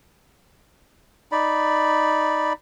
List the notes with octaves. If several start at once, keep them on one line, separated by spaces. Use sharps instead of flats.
D#4 D5 B5